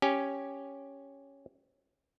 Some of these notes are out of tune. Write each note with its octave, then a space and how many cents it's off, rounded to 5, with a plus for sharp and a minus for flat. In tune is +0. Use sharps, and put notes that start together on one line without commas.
C#4 +0 G4 +0 G#5 +0